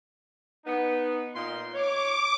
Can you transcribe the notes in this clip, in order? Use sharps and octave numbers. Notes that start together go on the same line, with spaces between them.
B3 D#4
A#2 D#4 C6
C#5 D6